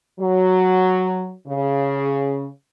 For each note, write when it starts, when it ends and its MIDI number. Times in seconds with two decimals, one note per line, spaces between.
0.19 1.33 54
1.47 2.47 49